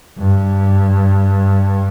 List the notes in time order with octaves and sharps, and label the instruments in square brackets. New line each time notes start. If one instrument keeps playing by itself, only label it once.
[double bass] G2